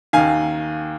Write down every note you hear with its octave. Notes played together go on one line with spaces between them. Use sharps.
D#2 D#3 F5 G#5